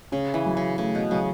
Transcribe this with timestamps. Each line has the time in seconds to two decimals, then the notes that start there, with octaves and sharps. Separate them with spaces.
0.12 C#3 C#4
0.34 E3
0.46 F#3
0.57 C#3
0.78 C#3 A3
0.95 B2
1.11 C#3 F#3